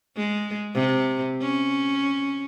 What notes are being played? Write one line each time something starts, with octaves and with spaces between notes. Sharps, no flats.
G#3
C3
C#4